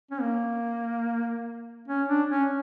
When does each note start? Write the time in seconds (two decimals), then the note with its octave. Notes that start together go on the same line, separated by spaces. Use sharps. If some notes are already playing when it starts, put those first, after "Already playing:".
0.11 C#4
0.21 A#3
1.88 C#4
2.08 D4
2.30 C#4